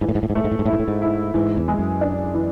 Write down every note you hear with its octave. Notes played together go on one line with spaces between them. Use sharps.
G#2 E3
A2
G#2
A2
G#2
A2 A3
G#2
A2
G#2
A2 E4
G#2
A2
G#2
E4
G#2 E3
E2
G#3
F#2
D4
E3